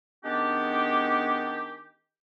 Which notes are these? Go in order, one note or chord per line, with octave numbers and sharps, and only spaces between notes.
D#3 G#3 B3 C#4 D4 G4